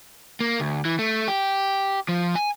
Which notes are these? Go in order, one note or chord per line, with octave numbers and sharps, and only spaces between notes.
A#3
D2
E3
A3
G4
F3
G#5